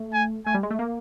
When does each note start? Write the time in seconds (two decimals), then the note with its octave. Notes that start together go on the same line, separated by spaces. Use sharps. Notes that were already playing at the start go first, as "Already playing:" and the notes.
Already playing: A3
0.13 G#5
0.46 A3 G#5
0.54 G3
0.63 G#3
0.71 A3
0.79 A#3